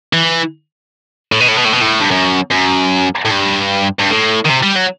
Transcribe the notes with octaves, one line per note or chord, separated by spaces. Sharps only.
E3
A2
B2
A2
B2
A2
B2
A2
G2
F#2
F#2
A2
G2
G2
A2
D#3
C3
G3
F#3